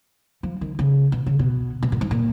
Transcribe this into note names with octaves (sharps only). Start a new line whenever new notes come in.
F3
D#3
C#3
B2
C#3
B2
B2
A#2
G#2
A#2